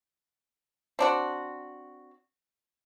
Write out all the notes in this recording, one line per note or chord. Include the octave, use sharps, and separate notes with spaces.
C4 D4 F#4